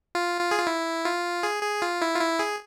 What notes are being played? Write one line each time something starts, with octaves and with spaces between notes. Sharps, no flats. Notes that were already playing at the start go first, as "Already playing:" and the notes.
F4
F4
G#4
F4
E4
F4
G#4
G#4
F4
E4
F4
E4
G#4